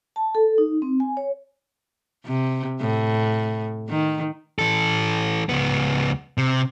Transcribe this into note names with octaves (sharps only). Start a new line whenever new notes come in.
A5
A4
D#4
C4
G#5
C#5
C3
A2
D#3
E3 A4
C#2 B3
C3